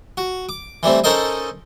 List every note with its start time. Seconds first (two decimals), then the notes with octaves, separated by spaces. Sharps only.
0.17 F#4
0.49 D6
0.83 E3 G3 A3 C4
1.04 C#4 D#4 A4 A#4 C5 D#5